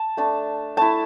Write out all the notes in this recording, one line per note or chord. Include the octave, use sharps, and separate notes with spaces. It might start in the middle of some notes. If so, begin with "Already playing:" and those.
Already playing: A5
A3 D4
A3 E4 A5